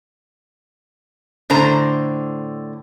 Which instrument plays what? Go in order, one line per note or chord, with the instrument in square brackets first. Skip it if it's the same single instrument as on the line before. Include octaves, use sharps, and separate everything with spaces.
[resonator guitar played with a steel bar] A2 D3 C5 A#5